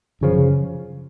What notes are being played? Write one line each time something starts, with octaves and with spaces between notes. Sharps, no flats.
F#2 C#3 F3